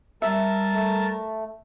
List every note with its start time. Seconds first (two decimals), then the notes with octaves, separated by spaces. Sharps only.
0.22 G3 A#4 E5 A5
0.74 A3